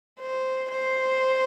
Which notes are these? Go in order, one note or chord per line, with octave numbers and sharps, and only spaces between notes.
C5
C5